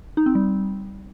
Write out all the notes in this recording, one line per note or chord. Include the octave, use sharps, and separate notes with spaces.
D#4
C4
G3